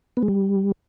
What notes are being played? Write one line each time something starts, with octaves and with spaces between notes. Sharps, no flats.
B3
G#3
G3